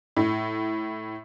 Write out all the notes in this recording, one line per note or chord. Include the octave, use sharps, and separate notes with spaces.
A2